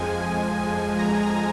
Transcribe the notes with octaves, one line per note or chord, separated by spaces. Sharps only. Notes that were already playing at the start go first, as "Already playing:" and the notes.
Already playing: F2 F3 G#3 G#5
A#5